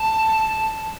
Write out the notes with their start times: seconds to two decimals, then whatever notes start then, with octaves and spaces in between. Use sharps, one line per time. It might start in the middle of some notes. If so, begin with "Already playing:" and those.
Already playing: A5